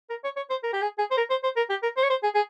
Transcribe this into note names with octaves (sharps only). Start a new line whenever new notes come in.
A#4
C#5
C#5
C5
A#4
G4
G#4
G#4
C5
A#4
C5
C5
A#4
G4
A#4
C5
C#5
C5
G#4
G#4